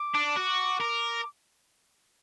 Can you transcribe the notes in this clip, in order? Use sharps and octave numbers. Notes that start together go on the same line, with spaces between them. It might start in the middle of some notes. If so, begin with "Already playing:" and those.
Already playing: D6
D4
F#4
A#4